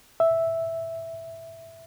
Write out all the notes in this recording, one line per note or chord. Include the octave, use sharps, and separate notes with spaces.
E5